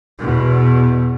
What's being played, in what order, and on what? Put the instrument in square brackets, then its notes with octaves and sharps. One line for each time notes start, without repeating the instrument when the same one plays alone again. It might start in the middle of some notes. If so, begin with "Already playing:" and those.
[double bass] E2 B2